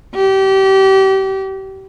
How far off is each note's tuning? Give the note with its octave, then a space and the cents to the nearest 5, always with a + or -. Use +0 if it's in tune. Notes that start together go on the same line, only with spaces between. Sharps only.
G4 -30